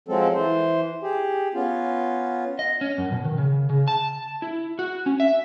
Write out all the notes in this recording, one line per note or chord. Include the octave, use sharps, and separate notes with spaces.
F3 F#3 G#3 C4 A4
E3 C5
G4 G#4
B3 C#4 F4
D#5
C#4
F#2
B2
D#3
C#3
C#3
A5
E4
F#4
C#4
E5